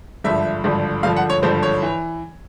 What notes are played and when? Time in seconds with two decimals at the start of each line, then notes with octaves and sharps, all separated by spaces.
0.24 G#1 G2 D3 F3 E5
0.64 G#1 G2 D3 F3
1.03 G#1 G2 D3 F3 F5
1.16 F#5
1.30 C#5
1.43 G#1 G2 D3 F3 C5
1.63 C#5
1.82 E3